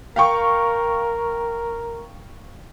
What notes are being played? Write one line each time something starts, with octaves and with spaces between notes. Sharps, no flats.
A#4 F5 G5 C#6